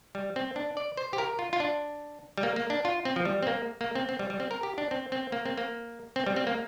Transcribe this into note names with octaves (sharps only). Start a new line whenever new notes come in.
G3
C4
D4
D5
C5
G4
A#4
F4
F4
D4
G3
A#3
A#3
D4
F4
C4
F3
G3
C4
A#3
A#3
C4
C4
G3
G3
C4
A#4
G4
D4
C4
C4
A#3
C4
A#3
C4
G3
C4
A#3